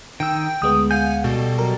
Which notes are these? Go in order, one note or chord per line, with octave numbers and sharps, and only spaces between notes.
D#3 G5 E6
D2 G#3 B3 D#6
F5 F#5 G#5 G6
B2 G3 A4
F#3 A#4